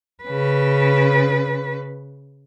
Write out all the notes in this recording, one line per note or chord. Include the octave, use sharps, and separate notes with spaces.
C#3 B4